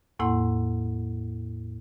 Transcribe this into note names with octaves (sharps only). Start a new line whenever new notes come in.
E2 A2 A#3 E4 F#5 C6